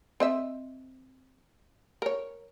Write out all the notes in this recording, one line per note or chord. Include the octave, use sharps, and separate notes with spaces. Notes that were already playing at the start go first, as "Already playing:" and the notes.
C4 D#5 E5
A#4 C#5